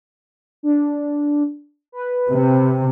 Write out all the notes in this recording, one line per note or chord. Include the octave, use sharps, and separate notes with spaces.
D4
B4
C3